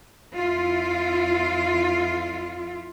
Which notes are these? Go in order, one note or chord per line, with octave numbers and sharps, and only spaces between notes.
F2 E4 F4